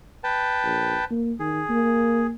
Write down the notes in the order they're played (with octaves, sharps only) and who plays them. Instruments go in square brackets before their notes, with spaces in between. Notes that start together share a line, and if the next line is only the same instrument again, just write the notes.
[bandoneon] B4 G5 A5
[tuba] A#1
A#3
[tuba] D#3 [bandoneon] G#4
[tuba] A#3